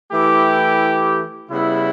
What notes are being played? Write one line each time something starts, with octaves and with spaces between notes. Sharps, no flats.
E3 A3 E4 G4
C#3 G3 B3 E4